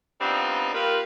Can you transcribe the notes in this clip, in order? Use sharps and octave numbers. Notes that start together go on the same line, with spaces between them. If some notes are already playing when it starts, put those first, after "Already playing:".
G3 B3 C4 D4 D#4 F4
A#3 F4 G4 A#4 B4 F5